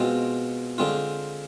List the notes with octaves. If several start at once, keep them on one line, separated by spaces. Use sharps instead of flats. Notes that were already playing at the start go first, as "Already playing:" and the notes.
Already playing: B2 G#3 C4 F4
D3 G#3 C4 F4